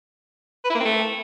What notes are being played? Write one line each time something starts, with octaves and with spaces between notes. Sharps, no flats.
B4
E4
A#3
C4
A3